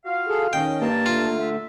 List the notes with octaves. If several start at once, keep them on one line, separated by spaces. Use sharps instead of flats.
F4 F#4 F5
G#4 A4
D#3 C#4 D#5 G5
G2 A#3 A5
D3 A3 F4
E5